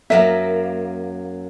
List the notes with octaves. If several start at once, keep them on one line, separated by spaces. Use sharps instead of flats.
F#2 F#3 A#3 E5